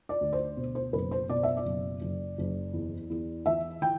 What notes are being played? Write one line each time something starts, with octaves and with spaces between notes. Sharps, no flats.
D5
D2
C5
B2
C5
F#1 B4
C5
B2 D5
E5
D5
F#1
F#1
F#1
E2
E2
E3 E5
E3 G5